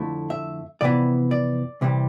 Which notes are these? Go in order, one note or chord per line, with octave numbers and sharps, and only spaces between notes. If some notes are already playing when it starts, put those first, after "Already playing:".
Already playing: F2 D3 A3 E4
E5
F2 C3 E3 B3 E4 D5
D5
C2 C3 E3 G3